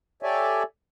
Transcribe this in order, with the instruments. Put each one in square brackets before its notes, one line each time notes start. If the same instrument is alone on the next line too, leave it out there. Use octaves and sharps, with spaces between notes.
[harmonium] G4 A4 C#5 D5 E5 G#5